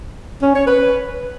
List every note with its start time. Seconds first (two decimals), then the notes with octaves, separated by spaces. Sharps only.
0.42 C#4
0.54 C#5
0.66 B4